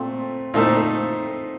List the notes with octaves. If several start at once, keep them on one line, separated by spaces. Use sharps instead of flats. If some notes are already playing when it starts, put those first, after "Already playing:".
Already playing: A#2 A3 C4
A#2 A3 D#4 A4 C5